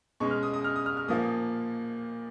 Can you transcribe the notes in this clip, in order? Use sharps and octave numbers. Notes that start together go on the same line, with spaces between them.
B2 G#3 C#4 C#6
F6
D#6
D#6
F6
D#6
F6
F6
A#2 F3 A#3 D#6